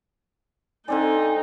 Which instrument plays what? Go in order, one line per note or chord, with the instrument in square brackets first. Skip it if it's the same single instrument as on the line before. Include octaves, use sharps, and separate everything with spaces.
[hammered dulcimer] D3 C4 D5 [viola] D#4 [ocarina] G#5